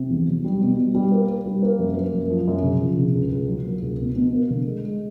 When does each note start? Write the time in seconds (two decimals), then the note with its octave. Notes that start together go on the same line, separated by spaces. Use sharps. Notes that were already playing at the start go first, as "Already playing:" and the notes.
Already playing: C3
0.10 E2
0.27 F#3
0.45 G3
0.61 B2
0.78 G3
0.95 G3
1.12 A#3
1.29 A#3
1.46 G3
1.63 A#3
1.79 F#2
1.97 A#3
2.13 F#2
2.30 F3
2.48 F#2
2.63 C#3
2.81 F3
2.97 C#3
3.15 C#2
3.32 C#2
3.49 F#3
3.65 A#3
3.82 C#2
3.99 B2
4.16 B2
4.33 A#3
4.50 D3
4.67 G#3
4.84 G#3